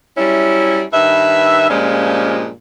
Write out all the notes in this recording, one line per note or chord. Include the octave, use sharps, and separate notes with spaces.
F#3 G3 C#4 E4
G2 D#3 B4 E5
G2 A#2 F3 G3 G#3 C#4